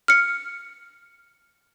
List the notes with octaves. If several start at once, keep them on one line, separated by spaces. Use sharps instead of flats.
F6 C#7